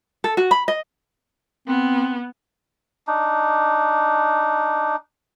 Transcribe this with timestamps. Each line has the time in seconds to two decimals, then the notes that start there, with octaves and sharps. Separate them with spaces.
0.24 A4
0.37 F#4
0.51 B5
0.68 D#5
1.68 B3 C4
3.07 D4 D#4